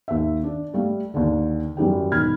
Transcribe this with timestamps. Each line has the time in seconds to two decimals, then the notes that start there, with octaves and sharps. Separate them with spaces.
0.08 D#2 E5
0.44 D4
0.74 G3 A3 F5
1.14 D#2 D3
1.77 F#2 E3 G3 G5
2.12 E1 D#3 B5 F6 G#6